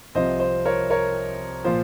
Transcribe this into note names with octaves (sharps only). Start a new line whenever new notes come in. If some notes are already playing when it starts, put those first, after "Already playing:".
C2 C3 F3 C5 D#5
C5
A#4 C#5
A#4 C#5
A#2 F3 C5